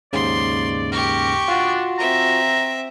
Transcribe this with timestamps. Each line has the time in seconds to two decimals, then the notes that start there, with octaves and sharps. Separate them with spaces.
0.13 D#2 G#2 C#3 D5 C6
0.92 G4 A#4 C#6
1.48 D4 F4 F#4
1.98 C4 E5 A#5